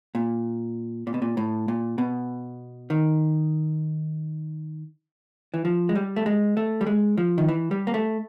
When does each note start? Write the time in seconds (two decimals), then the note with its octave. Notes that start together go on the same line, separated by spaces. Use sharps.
0.15 A#2
1.07 A#2
1.14 B2
1.22 A#2
1.37 A2
1.68 A#2
1.98 B2
2.90 D#3
5.54 E3
5.65 F3
5.89 G#3
5.95 G3
6.16 A3
6.26 G#3
6.57 A3
6.81 G3
6.86 G#3
7.18 F3
7.38 D#3
7.48 E3
7.71 G3
7.87 A#3
7.94 A3